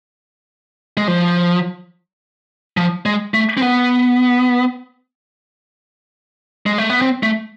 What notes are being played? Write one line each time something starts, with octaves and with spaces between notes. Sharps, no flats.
G#3
F3
F3
G#3
A3
C4
B3
G#3
A3
B3
C4
A3